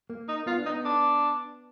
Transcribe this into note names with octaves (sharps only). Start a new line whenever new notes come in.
A#3
D#4
B3 F4
D4
D#4
B3
D4